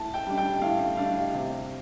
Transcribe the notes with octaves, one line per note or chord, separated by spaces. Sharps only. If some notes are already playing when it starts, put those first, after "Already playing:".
Already playing: A2 A5
G5
G3 D4
G5
A2 F5
G3 D4 F5
C3